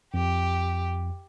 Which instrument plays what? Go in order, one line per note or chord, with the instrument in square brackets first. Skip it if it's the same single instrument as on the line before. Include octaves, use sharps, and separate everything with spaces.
[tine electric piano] F2 [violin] G4